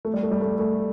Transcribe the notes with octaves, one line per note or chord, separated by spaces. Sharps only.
A3
G3
A3
G3
A3
A3